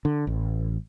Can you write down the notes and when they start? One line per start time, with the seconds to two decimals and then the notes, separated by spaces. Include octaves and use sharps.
0.05 D3
0.27 A1